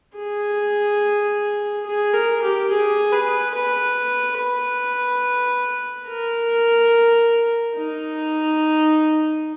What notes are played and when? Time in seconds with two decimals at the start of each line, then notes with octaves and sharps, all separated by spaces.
0.17 G#4
1.86 G#4
2.13 A#4
2.42 G4
2.70 G#4
3.13 B4
3.55 B4
4.39 B4
6.07 A#4
7.77 D#4